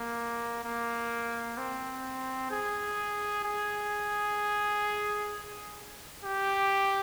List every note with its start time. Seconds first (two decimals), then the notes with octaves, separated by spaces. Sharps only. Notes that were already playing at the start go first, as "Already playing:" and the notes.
Already playing: A#3
0.64 A#3
1.57 C4
2.51 G#4
3.44 G#4
6.24 G4